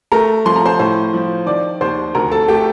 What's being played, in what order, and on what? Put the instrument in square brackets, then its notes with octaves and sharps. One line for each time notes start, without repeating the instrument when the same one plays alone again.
[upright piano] A3 A#4 A#5
F3 C6
A#5
C5 C6
A2 C5 C6
F3
D#3 D5 D6
D#2 C5 C6
D2 A#4 A#5
A4 A5
A3 G4 G5